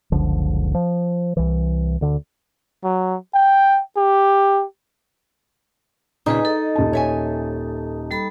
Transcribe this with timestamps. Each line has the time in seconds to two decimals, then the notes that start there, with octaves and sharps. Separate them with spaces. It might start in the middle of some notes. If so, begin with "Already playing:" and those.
0.12 F#1 C#2 D3 F3
0.74 F3
1.37 C2 E3
2.01 D2 D3
2.84 F#3
3.34 G5
3.96 G4
6.26 D#2 A#2 C#3 D#4 G#4 B4 G#5
6.45 A4 D#5
6.76 D#1 A5
6.93 C#5 E5 G#5
8.11 G3 A4 B5